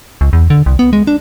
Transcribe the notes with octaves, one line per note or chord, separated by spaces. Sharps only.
C#2
E2
D3
C2
B3
G#3
D4